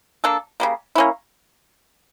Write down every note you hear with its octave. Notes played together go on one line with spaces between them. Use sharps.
A#3 D4 A4
C#3 G3 A#3
A#3 C#4 E4